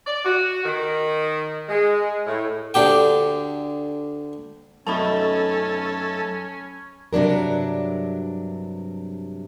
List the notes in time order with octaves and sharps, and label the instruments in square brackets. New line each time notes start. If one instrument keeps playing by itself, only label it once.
[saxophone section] D5
F#4
D#3
G#3
A2
[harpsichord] D2 D3 G4 G5
[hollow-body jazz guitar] F#2 A3 D#4 [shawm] C#4 [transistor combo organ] A4 [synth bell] A5 B5 C#6
[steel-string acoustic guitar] G2 C3 F#3 D4 A#4